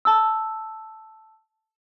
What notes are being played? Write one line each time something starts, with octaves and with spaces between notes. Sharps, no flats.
A5 E6